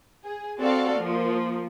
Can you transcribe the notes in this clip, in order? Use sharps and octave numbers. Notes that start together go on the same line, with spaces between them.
G#4
C4 F#4 A4 D5 F5
F3 A#3